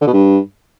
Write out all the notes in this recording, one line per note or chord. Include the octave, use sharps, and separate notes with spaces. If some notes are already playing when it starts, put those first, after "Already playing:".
D3
B2
G2